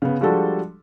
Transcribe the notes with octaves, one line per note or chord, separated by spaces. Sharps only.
C#3 B3
F3 G3 G#3 D4 F#4 A4